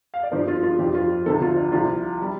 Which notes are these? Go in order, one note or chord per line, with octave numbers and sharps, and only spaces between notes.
F5
D5
G2 F3 C5
F4
F4
F2 F3 G4
F4
D2 C3 F3 A4
F4
D4
C2 C3 F3 F4
G3